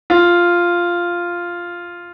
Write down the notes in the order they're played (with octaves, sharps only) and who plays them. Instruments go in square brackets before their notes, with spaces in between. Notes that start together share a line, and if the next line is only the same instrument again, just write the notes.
[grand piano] F4